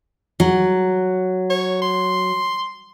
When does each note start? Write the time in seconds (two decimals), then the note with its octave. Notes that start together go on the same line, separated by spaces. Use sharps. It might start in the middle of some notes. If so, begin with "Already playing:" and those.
0.40 F#3
1.50 C#5
1.82 C6